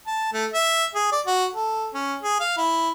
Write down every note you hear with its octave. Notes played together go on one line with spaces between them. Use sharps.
A5
A3
E5
G#4
D5
F#4
A4
C#4
G#4
F5
E4